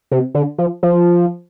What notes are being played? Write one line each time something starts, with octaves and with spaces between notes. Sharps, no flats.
C3
D3
F3
F3